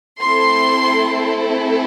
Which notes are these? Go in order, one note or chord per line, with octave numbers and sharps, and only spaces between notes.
A3 C4 E4 A4 C6